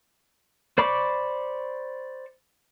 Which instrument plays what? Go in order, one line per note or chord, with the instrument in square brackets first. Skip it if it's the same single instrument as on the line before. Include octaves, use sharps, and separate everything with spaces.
[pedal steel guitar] C5 D5 B5 C#6 D6